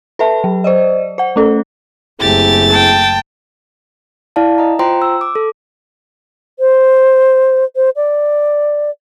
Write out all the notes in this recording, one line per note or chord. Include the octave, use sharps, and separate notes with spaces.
A4 B4 E5 A5
F#3
C5 D5 D#5
C5 F#5
A3 C#4 A4
F#1 A3 C4 E4 G4 G#4 A6
G5 A5
E4 D5 F5 A5
D#5 A#5
F4 C5 G5 A#5 C6
E6
D6
A4
C5
C5
D5